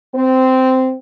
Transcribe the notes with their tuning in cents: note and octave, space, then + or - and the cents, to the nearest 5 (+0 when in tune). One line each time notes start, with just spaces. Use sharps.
C4 -10